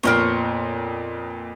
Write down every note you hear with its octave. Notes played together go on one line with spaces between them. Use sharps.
F2 A#2 B3 A#4 C5 C#5